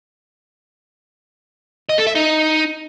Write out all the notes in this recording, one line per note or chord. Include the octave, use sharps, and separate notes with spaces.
D#5
A4
E5
D#4